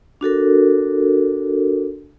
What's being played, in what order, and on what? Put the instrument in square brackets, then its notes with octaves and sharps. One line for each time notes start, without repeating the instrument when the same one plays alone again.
[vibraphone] D4 F#4 A4 A#4